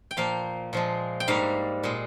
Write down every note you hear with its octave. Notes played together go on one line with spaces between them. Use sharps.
G5
A#2 F3 A#3 F5
A#2 F3 G#3
G5
G#2 G3 A#3 F5
A#2 G#3